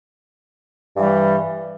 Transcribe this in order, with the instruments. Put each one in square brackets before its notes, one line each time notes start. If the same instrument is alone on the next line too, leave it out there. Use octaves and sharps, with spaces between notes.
[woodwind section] G2 E3 G3